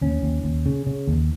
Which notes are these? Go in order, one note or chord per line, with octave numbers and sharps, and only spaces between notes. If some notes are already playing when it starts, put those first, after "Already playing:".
D#2 C#4
D#2
D#2
C#3
C#3
D#2